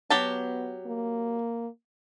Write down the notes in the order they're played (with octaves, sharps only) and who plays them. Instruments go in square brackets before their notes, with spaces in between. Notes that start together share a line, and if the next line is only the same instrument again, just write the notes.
[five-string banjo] F#3 G4 A5 [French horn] B3
[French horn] A#3